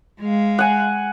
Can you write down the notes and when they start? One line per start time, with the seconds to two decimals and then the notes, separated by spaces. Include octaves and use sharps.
0.21 G#3 F5
0.59 F#5 G#5